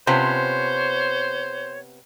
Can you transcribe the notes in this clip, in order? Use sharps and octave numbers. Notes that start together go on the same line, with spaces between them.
C3 F3 B3 C#4 C5 C#5